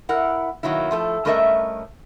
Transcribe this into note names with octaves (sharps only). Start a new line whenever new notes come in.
E4 A#4 F#5
B2 D#3 F#3 A#3 E4
F3 A3 A4
G2 A3 C#4 A#4 D#5 E5